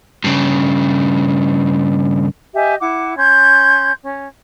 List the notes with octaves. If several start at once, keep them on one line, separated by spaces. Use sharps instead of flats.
G2 C#3
G4 D#5 E5 G#5
E4 F#5 D6
C#4 C6 G6 G#6
C#4